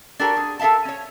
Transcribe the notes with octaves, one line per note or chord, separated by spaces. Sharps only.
D4 F#4 G4 A4 A#4
G#4
A4 A#4 E5 F5 A5
C#4 C#5